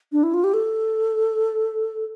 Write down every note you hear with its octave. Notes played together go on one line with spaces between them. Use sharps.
D4
E4
F4
G4
A4